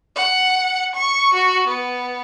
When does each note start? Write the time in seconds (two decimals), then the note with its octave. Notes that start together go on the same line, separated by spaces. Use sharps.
0.16 F#5
0.95 C#6
1.34 F#4
1.67 B3